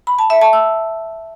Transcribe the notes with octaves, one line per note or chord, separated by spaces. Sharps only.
B5
A5
E5
A5
E6